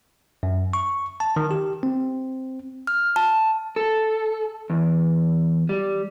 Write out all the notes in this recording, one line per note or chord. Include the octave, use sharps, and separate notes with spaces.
F#2
C#6
A5
D#3
G4
C4
F6
A5
A4
E2
G3